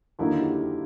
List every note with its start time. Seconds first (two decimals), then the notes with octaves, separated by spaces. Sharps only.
0.19 D#2 D3 F#3 A#3 D#4 E4
0.38 G4